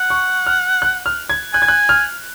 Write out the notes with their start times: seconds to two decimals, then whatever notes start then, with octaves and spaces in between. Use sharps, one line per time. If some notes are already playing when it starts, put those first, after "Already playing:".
Already playing: F#5
0.10 C#6
0.47 F6
0.82 F#6
1.06 F6
1.30 G#6
1.54 G#5 F#6
1.62 G#6
1.68 F#6
1.89 F6